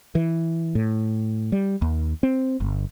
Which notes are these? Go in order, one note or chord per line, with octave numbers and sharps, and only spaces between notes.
E3
A2
G3
D#2
C4
G1